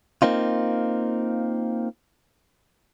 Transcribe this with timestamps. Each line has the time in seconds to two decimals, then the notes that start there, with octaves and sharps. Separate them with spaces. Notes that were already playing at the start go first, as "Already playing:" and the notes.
0.22 A#3 C4 D#4 F4